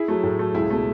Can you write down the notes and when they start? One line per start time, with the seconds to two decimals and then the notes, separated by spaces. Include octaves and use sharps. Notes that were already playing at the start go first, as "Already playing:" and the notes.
Already playing: E4 G#4
0.08 F#3 A3
0.23 A2
0.39 F#3 A3
0.55 C#2 E4 G#4
0.70 B2 A3